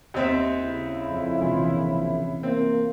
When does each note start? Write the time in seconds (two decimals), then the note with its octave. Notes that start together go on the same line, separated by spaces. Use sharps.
0.14 D#2 C4 E5
0.62 C#3 E4
1.10 F2
1.41 A#1 C3 E3 F4
2.43 A#3 C4